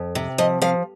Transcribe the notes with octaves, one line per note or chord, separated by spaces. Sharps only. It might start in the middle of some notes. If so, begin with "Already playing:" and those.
Already playing: F2
C3
F3 D#5
F3 F5